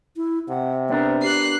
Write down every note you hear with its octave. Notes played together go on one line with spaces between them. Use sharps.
E4
C3 F#5
B3 D4 A#4 C5
G4 F#6 C7